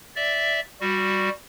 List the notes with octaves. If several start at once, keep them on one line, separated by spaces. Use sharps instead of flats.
D5 E5
G3 F#4